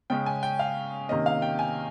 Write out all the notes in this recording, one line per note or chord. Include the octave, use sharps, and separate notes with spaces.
C#3 G#3 C#4 G5
G#5
G5
F5
C3 D#3 A#3 C#4 D#5
F5
G5
G#5